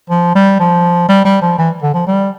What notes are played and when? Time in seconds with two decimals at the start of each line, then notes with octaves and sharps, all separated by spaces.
0.10 F3
0.35 G3
0.60 F3
1.09 G3
1.25 G3
1.42 F3
1.58 E3
1.83 D3
1.94 F3
2.07 G3